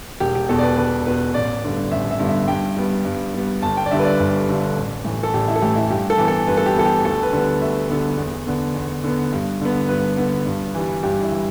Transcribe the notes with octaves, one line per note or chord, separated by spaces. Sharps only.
E1 G4
G4
E2 B2 A4
D5
B4
E1 B4
E2 B2 B4
A1 D5
G2 D3 B3
A1 E5
E5
G2 D3 B3
E5
G2 G5
G3 B3
G2
G3 B3
G1 A5
G5
D5
G2 D3 G3 E5
B4
D5
G1
G2 D3 G3
A1
A2 E3 A3
A4
A1 G4
E4
A4
A2 E3 A3 G4
E4
G2 G4
A4
E3 B3
A4
G2 B4
A4
G4
E3 B3 A4
G4
D2 A4
B4
D3 G3 B3
D2 E5
D3 G3 B3
E2
D3 B3
E2
D3 B3
G2
D3 B3
G2 B4
D3 B3
G2
E3 G3
G2 G4
E4
E3 G3